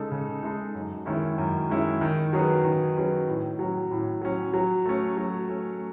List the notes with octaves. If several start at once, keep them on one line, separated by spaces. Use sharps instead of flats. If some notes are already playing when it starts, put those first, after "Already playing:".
Already playing: C#3 G#3 D#4 A4
C#3
G#3 D#4 A4
F#2
D#3 G#3 C#4 E4
F#2
D#3 G#3 C#4 E4
D#3
F#3 C#4 G#4 B4
D#3
F#3 C#4 G#4 B4
A2
F#3 C#4
A2
F#3 C#4
F#3
A3 C#4
F#3
A3 C#4